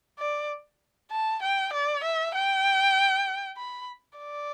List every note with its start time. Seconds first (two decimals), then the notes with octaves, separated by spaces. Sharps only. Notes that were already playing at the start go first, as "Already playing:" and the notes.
0.19 D5
1.11 A5
1.42 G5
1.73 D5
2.04 E5
2.34 G5
3.57 B5
4.19 D5